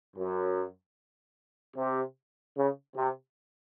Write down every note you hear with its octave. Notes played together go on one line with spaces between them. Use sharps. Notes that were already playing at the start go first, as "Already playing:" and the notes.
F#2
C3
C#3
C3